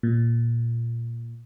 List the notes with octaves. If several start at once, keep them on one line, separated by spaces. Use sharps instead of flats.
A#2